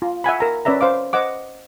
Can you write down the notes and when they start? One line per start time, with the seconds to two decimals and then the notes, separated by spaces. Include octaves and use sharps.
0.02 F4
0.24 E5 F#5 G#5 B5
0.40 A#4 A#5
0.65 C#4 B4 D5 E5 A#5
0.81 C5 F5 D6
1.13 C5 D#5 F#5 D6